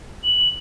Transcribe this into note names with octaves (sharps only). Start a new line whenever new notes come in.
F#7